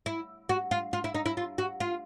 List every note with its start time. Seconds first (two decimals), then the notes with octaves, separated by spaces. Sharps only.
0.06 E4
0.49 F#4
0.71 F4
0.93 F4
1.04 E4
1.15 D#4
1.26 E4
1.37 F4
1.58 F#4
1.80 F4